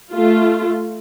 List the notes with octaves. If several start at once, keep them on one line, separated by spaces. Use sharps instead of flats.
A3 F4